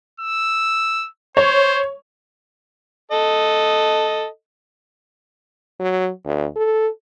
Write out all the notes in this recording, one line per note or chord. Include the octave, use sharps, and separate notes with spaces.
E6
C5 C#5
A4 D#5
F#3
D2
A4